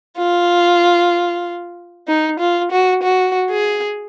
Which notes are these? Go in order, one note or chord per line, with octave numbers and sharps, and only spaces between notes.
F4
D#4
F4
F#4
F#4
G#4